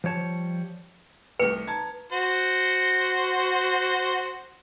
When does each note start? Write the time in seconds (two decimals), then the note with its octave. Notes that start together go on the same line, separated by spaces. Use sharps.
0.04 F3 G3 C#5 A5
1.39 C2 A3 B4 C#7
1.67 A5 A#5 G#6
2.12 F#4 C5